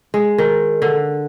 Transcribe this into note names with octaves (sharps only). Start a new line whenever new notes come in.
G#3
D#3
D3